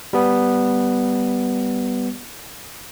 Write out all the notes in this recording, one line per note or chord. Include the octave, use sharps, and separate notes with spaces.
G3 B3